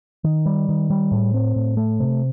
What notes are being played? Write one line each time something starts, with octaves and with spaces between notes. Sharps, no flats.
D#3
G3
D#3
G3
A2
C4
A2
A3
C3